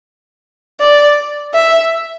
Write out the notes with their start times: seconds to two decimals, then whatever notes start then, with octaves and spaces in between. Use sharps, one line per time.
0.80 D5
1.54 E5